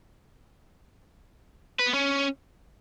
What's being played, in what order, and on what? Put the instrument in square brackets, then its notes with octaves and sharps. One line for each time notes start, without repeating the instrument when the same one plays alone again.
[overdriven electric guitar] B4
B3
C#4